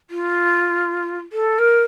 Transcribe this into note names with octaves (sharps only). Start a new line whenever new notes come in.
F4
A4
A#4